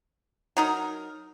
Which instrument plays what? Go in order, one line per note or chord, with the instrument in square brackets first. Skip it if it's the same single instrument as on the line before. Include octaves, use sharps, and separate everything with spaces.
[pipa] F#3 D#4 A#4